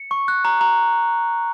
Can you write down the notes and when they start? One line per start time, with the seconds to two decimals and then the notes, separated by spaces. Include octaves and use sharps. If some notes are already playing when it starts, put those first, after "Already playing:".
Already playing: C#7
0.11 C#6
0.28 F#6
0.45 A#5
0.61 A#5